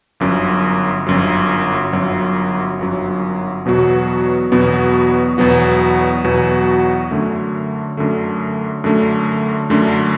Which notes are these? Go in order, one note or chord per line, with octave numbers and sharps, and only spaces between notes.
G1 F#2 F#3
G1 F#2 F#3
G1 F#2 F#3
G1 F#2 F#3
E2 B2 F#3 B3 F#4
E2 B2 F#3 B3 F#4
E2 B2 F#3 B3 F#4
E2 B2 F#3 B3 F#4
F#2 D3 A3
F#2 D3 A3
F#2 D3 A3
F#2 D3 A3